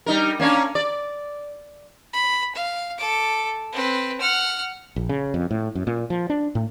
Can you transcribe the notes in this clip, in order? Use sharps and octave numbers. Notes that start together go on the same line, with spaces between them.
G3 D#4 A#4
A#3 C#4 D4
D5
B5
F5
A4 D6
C4 B4
F#5 F6
A#1
C#3
F2
A2
F#2
A#2
F3
D4
A2